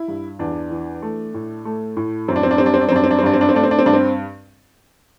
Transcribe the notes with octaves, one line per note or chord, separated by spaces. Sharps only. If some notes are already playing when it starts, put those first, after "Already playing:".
Already playing: E4
G2
E2 D4
E3
A3
A2
A3
A2
F#2 C4
D4
C4
D4
G3 C4
D4
C4
D4
C4
F#2 D4
C4
D4
C4
G2 D4
C4
D4
C4
A3 D4
C4
D4
C4
G2 D4
C4